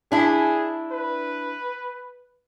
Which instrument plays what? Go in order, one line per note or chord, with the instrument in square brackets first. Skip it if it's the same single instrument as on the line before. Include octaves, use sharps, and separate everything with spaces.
[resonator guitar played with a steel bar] D4 E4 [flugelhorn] G#4
[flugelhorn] B4